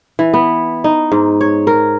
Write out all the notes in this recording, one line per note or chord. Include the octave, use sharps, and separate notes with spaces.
E3
B3
D#4
G#2
C#5
A#4